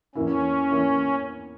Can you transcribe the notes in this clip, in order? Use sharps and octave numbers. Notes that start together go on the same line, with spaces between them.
E2 E3 A#3 C#4 E4
E3 A#3 E4